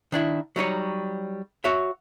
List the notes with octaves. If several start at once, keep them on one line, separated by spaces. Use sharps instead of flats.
D#3 D4 E4
F#3 G3 D#4 C#5
F#4 C#5 E5